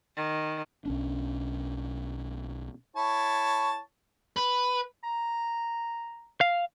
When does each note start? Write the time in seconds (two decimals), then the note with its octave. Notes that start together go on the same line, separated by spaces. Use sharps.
0.16 D#3
0.85 B1 C#4 D4
2.96 E4 C#5 A5
4.36 B4
5.04 A#5
6.41 F5